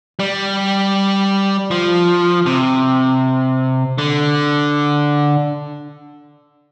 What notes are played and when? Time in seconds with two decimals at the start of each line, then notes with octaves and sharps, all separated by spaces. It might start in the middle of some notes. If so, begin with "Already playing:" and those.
0.19 G3
1.71 F3
2.46 C3
3.98 D3